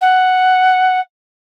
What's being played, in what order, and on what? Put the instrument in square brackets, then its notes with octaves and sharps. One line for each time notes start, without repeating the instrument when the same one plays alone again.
[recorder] F#5